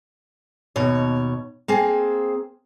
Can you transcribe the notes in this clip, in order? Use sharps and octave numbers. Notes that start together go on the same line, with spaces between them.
D#2 B2 C#5
A#3 C4 G#4